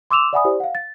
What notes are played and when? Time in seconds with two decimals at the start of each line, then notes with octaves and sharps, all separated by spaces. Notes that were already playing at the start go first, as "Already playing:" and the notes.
0.11 C6 D6 E6 E7 F7
0.33 D5 E5 F#5 G#5 B5 D#6
0.45 E4 G4 C5 D5
0.60 F5 F#5
0.75 A6